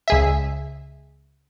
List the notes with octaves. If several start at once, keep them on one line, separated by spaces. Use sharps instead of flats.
C#2 G#4 E5